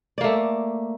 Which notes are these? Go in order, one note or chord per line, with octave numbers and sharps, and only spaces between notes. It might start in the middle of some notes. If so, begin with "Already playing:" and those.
A3 A#3 D5